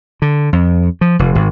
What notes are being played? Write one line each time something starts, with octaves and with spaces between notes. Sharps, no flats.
D3
F2
F3
F1
G#1